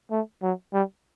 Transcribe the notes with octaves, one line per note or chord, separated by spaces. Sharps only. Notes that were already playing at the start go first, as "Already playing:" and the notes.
A3
F#3
G3